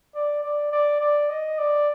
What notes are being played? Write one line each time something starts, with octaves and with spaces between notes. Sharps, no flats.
D5
D5
D5
D5
D#5
D5